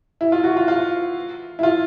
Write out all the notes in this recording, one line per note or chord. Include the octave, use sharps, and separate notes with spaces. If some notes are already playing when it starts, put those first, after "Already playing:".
E4
F4
F#4
F4
F4
E4
F4